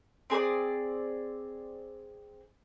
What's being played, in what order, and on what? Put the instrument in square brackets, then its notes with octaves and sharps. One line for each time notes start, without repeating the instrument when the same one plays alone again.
[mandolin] C4 G#4 C5 D5